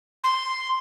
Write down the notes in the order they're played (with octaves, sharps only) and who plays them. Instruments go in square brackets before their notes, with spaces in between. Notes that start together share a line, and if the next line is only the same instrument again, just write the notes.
[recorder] C6